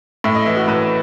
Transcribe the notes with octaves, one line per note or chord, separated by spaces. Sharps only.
A2 E5
D#5
E3 E4
F#4
A2 B4